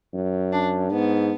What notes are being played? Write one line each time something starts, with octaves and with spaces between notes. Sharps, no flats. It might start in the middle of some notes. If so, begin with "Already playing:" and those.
F#2
D4
G#2 B3